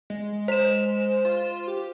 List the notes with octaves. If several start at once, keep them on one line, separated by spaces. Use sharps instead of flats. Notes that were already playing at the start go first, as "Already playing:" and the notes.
G#3
C5 E7
F4
G4